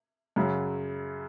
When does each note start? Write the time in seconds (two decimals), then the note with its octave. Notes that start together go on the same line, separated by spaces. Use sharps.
0.36 F#2 C#3 F#3